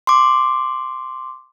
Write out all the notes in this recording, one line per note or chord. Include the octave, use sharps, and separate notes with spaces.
C6 D6